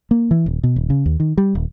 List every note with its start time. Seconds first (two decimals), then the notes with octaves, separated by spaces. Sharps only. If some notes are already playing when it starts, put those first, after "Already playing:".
0.11 A#3
0.31 E3
0.46 D#1
0.63 B2
0.76 D#1
0.90 C#3
1.06 D#2
1.20 D#3
1.37 G3
1.55 D#1